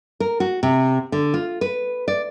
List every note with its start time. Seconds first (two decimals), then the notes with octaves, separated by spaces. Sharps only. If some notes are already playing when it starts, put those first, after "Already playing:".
0.20 A#4
0.40 F#4
0.63 C3
1.12 D3
1.34 F4
1.61 B4
2.08 D5